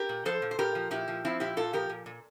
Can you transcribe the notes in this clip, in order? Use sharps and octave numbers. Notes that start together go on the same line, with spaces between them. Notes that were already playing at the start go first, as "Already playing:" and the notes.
Already playing: G4 A#4
A#2
F3 A4 C5
A#2
C5
A#2 G4 A#4
F3
A#2 E4 G4
F3
F3 C4 E4
A#2 E4 G4
A#2 F4 A4
F3 G4 A#4
A#2
A#2